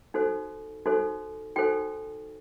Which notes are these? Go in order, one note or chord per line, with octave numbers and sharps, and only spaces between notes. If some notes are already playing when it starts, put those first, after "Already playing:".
D#4 F#4 A4 C5
D#4 F#4 A4 C5
D#4 F#4 A4 C5 G5